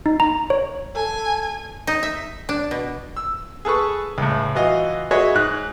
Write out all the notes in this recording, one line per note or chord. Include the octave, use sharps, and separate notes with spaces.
D#4
A#5
C#5
A4 G#5
D#4
E5
D4
B2
E6
G#4 A4 B4 C#6
C#2 A2
E3 F4 F#4 D#5
F#4 G#4 B4 C#5 D#5 E5
G#2 D#4 F#6